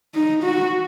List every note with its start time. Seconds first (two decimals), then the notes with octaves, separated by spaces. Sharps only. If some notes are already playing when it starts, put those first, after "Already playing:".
0.15 D#4
0.43 F#4